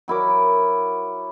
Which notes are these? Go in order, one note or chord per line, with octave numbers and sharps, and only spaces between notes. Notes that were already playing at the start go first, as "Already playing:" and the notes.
F#3 E4 A#4 D6